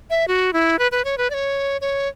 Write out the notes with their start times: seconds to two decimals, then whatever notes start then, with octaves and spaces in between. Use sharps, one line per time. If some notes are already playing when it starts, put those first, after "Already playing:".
0.10 E5
0.28 F#4
0.53 E4
0.79 B4
0.92 B4
1.05 C#5
1.18 B4
1.30 D5
1.34 C#5
1.81 C#5